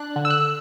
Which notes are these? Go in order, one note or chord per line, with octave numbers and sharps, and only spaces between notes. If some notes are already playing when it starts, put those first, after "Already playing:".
Already playing: D4 F#6
D3
E6
F#6